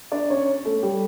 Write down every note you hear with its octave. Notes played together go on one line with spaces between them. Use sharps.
D4 D5
C#4 C#5
A3 A4
G3 G4